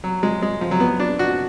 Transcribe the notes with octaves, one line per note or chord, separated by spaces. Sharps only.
F#3
G#3
G#3
F3
F#3
B3
D4
F#4